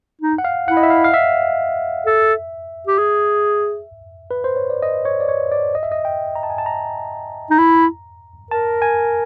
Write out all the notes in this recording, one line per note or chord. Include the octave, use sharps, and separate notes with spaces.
D#4
F#5
F5
E4 F#5
D#5
E5
F5
F5
E5
A4
G4
G#4
B4
C5
C#5
D5
D#5
C#5
D5
C#5
D5
D#5
E5
D#5
G5
A#5
A5
G#5
A5
A#5
D#4
E4
A#4 A5
G#5